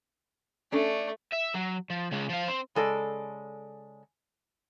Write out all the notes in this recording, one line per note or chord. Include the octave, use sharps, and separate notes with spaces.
A3 C#4 D4 A4
E5
F#3
F3
C#3 G#3
F3 F5
C4
C#3 G#3 A4 D5